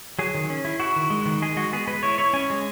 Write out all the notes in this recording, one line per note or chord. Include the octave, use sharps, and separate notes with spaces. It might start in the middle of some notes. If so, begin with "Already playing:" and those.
F#3 G#4
D#3
C#4
E4
E4 F#4
D#3
G#3
D#3
G#3 G#4
G#3 F#4
B3 G#4
G#3 B4
E4 C#5
E4 C#5
C#4 G#5
G#3